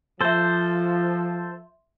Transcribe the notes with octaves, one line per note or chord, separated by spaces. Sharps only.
F3 A4 C5 E5 C6